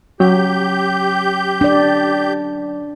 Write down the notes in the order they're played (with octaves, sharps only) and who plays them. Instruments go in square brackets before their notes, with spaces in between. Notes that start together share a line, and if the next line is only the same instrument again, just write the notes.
[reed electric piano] F#3 C#5 G5 [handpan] C#4 [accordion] G4 G6
[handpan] D4 D5